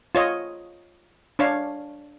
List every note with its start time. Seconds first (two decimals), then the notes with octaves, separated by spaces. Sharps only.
0.15 F4 C#5 D#5
1.39 D4 C#5 F5